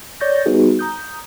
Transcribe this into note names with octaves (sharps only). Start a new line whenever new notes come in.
C#5 D5 C#6 G6 A6 A#6
G3 B3 D#4 F#4 G#4
A#5 D#6 G6